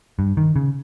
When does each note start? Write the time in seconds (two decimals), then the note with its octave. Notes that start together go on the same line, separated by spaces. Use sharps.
0.19 G2
0.37 D#3
0.56 C#3